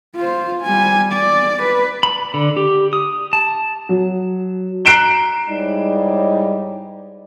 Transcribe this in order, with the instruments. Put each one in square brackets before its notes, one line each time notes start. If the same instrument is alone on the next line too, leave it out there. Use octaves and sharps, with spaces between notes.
[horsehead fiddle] F4 C5
G3 G#5
D5
B4
[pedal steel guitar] B5
D3
G4
D#6
A5
[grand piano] F#3
A#5 F#6 C7 D7 E7 G7
[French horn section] G#2 G3 D#4 E4 C#5 D5